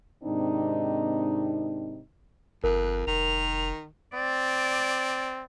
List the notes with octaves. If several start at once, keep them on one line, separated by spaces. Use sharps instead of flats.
G#2 C3 D#3 C4 D4 D#4
G1 F2 A#4 F#6
F1 D#3 F7
C4 D5